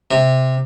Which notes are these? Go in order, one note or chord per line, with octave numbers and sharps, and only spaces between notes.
C3